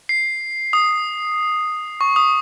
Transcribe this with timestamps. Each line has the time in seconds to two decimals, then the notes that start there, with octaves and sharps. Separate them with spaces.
0.09 C7
0.73 D#6
2.01 C#6
2.16 D#6